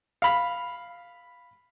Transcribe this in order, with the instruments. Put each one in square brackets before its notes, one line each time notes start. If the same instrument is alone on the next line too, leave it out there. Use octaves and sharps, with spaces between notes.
[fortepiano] F5 B5